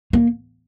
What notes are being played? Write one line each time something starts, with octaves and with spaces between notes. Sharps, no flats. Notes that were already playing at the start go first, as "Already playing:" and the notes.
A#3